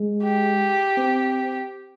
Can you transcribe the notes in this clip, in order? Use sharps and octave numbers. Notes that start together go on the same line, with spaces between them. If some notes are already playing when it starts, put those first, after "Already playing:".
Already playing: G#3
G4
C4